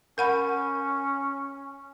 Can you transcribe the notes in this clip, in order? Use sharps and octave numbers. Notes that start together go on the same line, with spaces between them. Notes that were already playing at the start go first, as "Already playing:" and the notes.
C#4 A#4 F#5 B5